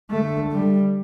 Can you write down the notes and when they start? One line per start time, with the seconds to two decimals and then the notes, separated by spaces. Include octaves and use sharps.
0.11 D3 A3
0.52 G3